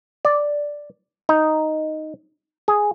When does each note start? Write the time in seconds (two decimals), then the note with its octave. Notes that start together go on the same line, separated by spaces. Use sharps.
0.25 D5
1.29 D#4
2.68 G#4